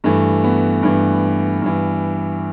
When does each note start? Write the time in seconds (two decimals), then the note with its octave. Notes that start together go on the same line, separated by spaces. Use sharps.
0.04 G2 E3 A3
0.44 B3
0.83 G2 E3
1.62 G2 E3